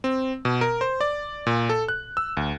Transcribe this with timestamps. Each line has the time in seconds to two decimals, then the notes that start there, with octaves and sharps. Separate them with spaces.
0.04 C4
0.45 B2
0.61 A#4
0.81 C5
1.01 D5
1.47 A#2
1.69 A4
1.88 F#6
2.17 E6
2.37 D2